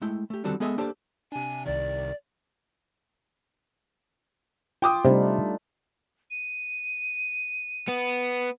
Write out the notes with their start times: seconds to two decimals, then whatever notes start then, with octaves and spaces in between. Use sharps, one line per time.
0.02 G#3 A3 E4 G5
0.30 A3 G4
0.44 D3 D#3 G3 C4 F#4 A4
0.60 G#3 B3 G#4 A4 D#5 E5
0.78 A#3 D4 G4 A4 C5 D5
1.32 C3 D4 G#5
1.66 C2 C3 D#3 D5
4.82 F4 G5 D6 D#6
5.05 C3 G3 A3 D4 D#4
6.31 D#7
7.89 B3